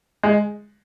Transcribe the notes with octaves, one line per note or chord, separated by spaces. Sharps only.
G#3